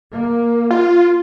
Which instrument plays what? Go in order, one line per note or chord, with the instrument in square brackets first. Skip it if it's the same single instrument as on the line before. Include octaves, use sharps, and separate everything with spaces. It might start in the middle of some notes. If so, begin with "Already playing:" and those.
[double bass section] A#3
[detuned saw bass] F4